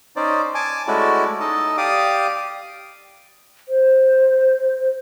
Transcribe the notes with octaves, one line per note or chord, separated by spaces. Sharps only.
C#4 D#4 C5 D5
G#5 A5 D6
G#3 A3 C#4 E4 F#4 D5
D#4 A4 D#5 A5
G4 D5 F5 D6 D#6
C5